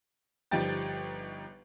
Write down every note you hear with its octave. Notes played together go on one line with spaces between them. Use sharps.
G1 F3 G3 D#4 G5 A6